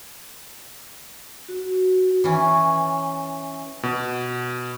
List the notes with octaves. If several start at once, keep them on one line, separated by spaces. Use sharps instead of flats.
F#4
E3 C#4
B2